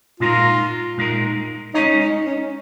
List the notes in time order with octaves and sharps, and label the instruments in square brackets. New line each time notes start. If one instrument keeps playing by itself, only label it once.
[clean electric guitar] A#2 G#3 D#4 A#4 [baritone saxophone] F4
[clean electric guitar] A#2 G#3 D#4 A#4
[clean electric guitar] G#3 C#4 G#4 C#5 [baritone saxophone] D#4
[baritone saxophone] D#4
C#4